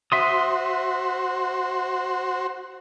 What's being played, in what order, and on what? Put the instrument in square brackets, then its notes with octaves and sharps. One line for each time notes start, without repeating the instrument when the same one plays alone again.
[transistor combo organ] F#4 C5 [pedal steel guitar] E5 C6 D#6